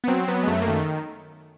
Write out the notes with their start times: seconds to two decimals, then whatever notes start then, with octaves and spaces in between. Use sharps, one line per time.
0.04 B3
0.08 F#3 C4
0.28 F#3 B3
0.43 G#3
0.47 F#2 A3
0.62 A#3
0.68 D#3 A3